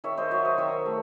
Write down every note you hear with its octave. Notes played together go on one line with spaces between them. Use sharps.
D#3 C#5 E5
C5 D#5
F#3 C#5 E5
C5 D#5
D#3 C#5 E5
A3